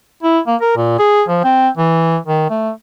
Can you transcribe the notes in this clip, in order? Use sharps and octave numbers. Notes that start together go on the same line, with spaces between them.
E4
A#3
A#4
A#2
G#4
F3
C4
E3
D#3
A3